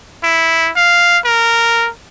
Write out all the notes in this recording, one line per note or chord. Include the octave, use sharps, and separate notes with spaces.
E4
F5
A#4